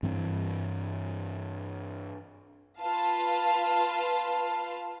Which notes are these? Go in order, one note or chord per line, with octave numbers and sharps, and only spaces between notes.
G2 E3 C4
F4 B4 F5 A5